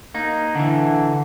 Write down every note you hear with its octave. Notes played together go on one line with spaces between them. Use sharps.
A#3 D#4
D3 E3